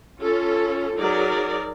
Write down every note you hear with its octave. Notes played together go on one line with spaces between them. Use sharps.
C#4 F4 A4
F#3 D#4 G#4 A#4 D5